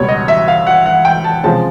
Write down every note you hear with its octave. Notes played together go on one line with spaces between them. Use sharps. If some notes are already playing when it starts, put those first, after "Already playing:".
Already playing: C#2 B2 G3 B3 C#5
D#5
E5
F5
F#5
F#5
G5
A5
C3 F3 G#3 C#4 A5